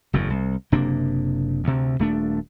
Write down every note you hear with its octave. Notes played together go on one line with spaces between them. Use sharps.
F#1 E2 A2
C2
F#1 C3 A#3 D4
D2 C3
D#1 A3 D4